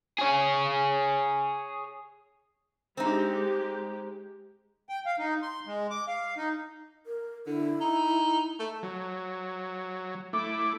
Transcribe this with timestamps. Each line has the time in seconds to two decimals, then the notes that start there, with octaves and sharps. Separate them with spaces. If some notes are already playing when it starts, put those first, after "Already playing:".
0.19 G#4 C#5
2.97 G#3 C4 D#4 G4
4.89 G5
5.06 F5
5.19 D#4
5.43 C6
5.67 G#3
5.90 D6
6.08 F5
6.37 D#4
7.06 A#4
7.46 D3 E4
7.80 D#4
8.59 A3
8.83 F#3
10.33 A3 E4 D6